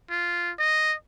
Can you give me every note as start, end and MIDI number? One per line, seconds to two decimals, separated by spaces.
0.10 0.52 65
0.59 0.94 75